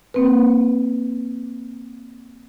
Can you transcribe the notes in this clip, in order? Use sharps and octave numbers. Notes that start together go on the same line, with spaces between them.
A#3 C4 B4